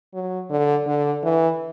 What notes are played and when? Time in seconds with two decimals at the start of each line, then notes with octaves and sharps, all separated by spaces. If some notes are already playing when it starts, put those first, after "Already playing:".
0.14 F#3
0.50 D3
0.87 D3
1.24 E3